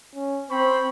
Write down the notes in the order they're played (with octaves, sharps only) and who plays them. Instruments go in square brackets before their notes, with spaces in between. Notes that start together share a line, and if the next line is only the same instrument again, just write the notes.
[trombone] C#4
[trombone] C4 [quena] C5 [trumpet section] B5 C#6